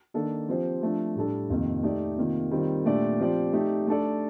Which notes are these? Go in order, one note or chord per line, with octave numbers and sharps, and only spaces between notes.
D#3 A#3 D4 A4
F3 C4 G4 C5
F3 A3 D4
A2 G3 D4 A4
F2 C3 D#3 A#3
A3 D#4 G4 D5
C3 D#3 A#3 F4
D#3 G3 C4 F4
A#2 A3 D4 G4 D5
F3 C4 G4 D5
A3 D#4 G4 D5
A3 D4 A4 D5